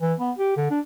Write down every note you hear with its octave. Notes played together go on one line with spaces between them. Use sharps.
E3
B3
G4
D3
D4